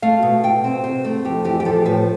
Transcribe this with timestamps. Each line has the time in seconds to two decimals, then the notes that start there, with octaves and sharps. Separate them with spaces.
0.02 A3 F5
0.23 B2
0.43 B2 G5
0.64 C4
0.84 C3 C5
1.04 A3 A4
1.25 F2 G4
1.45 E3 G4
1.60 G4
1.65 F3 A4
1.86 A2 B4